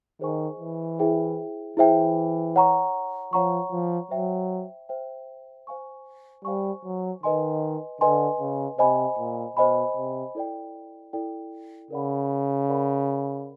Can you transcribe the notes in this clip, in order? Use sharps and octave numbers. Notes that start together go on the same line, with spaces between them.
D#3 G#4 C5 D#5 G#5 C#6
E3
E4 G#4 C5 E5 G5
E3 E4 G#4 C5 E5 G5
C#5 F#5 A#5 C#6
F3 C#5 F#5 A#5 C#6
F3
F#3 C5 E5 G5
C5 E5 G5
C5 F5 G#5 C#6
G3 C5 F5 G#5 C#6
F#3
D#3 B4 D#5 G#5 C6
D3 B4 D#5 G#5 C6
C#3
C3 C5 D#5 G#5 B5
A#2
B2 C5 D#5 G#5 B5
C3
E4 A4 D5 G5
E4 A4 D5 G5
C#3 A#4 D5 F#5 B5
A#4 D5 F#5 B5